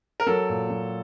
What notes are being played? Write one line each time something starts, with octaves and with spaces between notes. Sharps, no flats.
A#4
F#3 A4
A#2
F#3